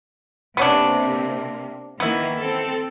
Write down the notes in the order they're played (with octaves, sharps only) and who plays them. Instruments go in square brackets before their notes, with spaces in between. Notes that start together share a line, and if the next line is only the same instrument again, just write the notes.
[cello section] C3 A#3 [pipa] B3 C#4 D4
[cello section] D#3 E3 A#3 [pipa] B3 E4
[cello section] C4 A4